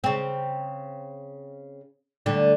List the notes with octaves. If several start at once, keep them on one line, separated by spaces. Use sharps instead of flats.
C#3 C4
D2 D3 G3